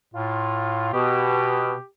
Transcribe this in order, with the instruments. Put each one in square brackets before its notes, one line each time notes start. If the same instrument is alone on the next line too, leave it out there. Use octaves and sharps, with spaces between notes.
[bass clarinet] A2 [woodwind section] F4
[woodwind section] B2 [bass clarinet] G4